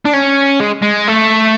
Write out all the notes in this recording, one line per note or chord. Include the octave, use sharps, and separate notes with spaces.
D4
C#4
G#3
G#3
A3